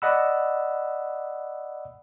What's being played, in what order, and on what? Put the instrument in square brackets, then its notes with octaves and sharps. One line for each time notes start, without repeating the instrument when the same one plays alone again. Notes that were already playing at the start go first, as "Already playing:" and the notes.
[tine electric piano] D5 D#5 F#5 B5 E6